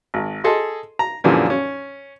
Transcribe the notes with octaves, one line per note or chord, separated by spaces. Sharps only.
G#1
G#4 A4 D#5 C6
A#5
F#2 A#2 D3 E3 F3 G3
C#4